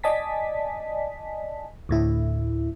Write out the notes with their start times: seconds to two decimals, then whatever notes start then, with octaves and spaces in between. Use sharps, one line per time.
0.04 D5 D#5 G#5 A5 B6
1.89 D2 A2 E4